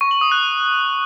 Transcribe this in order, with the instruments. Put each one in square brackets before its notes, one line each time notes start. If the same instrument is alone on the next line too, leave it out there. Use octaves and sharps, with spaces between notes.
[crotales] C#6
F#7
D#6
F#6